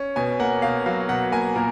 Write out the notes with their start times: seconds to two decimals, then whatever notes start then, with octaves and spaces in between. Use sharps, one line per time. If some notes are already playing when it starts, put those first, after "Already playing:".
Already playing: C#4
0.16 B2 G#5
0.40 A#3 F#5
0.62 B2 F5
0.86 F#3 F5
1.09 B2 F#5
1.32 A#3 G#5
1.56 A#2 A#4